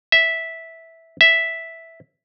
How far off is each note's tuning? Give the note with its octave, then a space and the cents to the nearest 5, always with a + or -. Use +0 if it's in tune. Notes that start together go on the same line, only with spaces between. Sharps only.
E5 -10
E5 -5